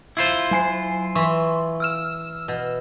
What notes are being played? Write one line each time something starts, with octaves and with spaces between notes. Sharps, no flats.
E4 F4 C5
F#3 G#5 C7
E3 E5 C6 C#6
E6 F6 E7
B2